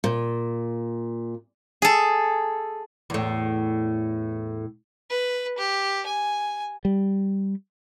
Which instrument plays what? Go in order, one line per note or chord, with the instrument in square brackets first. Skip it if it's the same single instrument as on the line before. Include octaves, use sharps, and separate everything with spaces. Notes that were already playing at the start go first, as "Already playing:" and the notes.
[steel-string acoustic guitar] A#2
[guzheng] G#4 A4
[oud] E2 A2
[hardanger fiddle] B4
G4
G#5
[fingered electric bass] G3